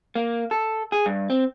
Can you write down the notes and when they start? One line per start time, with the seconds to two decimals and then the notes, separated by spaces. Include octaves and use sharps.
0.16 A#3
0.51 A4
0.92 G#4
1.06 G2
1.30 C4